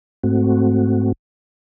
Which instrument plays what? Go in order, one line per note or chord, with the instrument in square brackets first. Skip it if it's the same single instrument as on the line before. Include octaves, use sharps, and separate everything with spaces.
[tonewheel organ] G#2 A3 C4 F#4